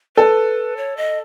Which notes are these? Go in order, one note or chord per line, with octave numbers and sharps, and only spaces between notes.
A4 B4
C#5
D#5